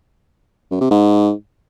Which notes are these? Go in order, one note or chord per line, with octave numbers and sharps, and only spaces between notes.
F#2
C3
G#2